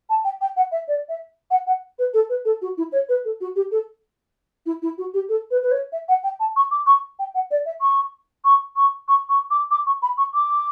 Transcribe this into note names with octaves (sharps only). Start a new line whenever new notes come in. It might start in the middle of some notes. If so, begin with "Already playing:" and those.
A5
G5
G5
F#5
E5
D5
E5
F#5
F#5
B4
A4
B4
A4
F#4
E4
C#5
B4
A4
F#4
G4
A4
E4
E4
F#4
G4
A4
B4
B4
C#5
E5
F#5
G5
A5
C#6
D6
C#6
G5
F#5
D5
E5
C#6
C#6
C#6
C#6
C#6
D6
D6
C#6
B5
C#6
D6